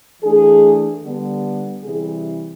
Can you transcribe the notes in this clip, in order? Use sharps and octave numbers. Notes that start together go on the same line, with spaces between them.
E3 A3 D4 G#4
D3 G3 B3
C3 E3 G3 G#4